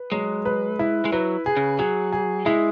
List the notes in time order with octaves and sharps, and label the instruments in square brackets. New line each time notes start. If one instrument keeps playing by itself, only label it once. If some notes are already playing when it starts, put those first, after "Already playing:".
Already playing: [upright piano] B4
[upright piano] F#3 [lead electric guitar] G#3
[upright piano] B4
E4
[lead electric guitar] G#3
[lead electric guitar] F#3 [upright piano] B4
[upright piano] G#4
[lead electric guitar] C#3
[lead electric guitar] F#3 [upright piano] G#4
[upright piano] G#4
[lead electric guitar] G#3 [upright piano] E4